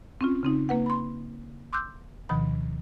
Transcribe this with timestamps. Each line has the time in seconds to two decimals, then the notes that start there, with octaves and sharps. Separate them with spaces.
0.21 C4 C#4 F4
0.43 C#3 C4 D#4
0.69 A#3 B4 F#5
0.86 B5 C6
1.73 C6 D6 E6 F#6 G6
2.29 D2 B2 D#3 F3 B5